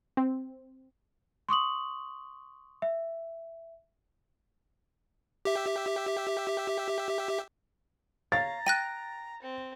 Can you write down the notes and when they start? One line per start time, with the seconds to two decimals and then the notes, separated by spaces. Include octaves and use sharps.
0.17 C4
1.49 C6 C#6 D#6 F#7
2.82 E5
5.45 G4 E5
8.32 C#5 F5 A#5 A6
8.66 G5 F#6 A#6 D#7
9.42 C4